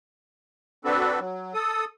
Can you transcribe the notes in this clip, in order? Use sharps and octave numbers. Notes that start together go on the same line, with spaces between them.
C4 D4 F#4 A4 B4
F#3
A4 D#6